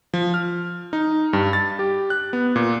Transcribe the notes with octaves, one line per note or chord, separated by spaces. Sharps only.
F3
F6
D#4
G2
A6
G4
F#6
B3
A#2